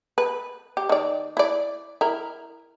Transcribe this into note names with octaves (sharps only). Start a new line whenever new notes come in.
B4
G4
D#3 D5
E4 D5
E4 A#4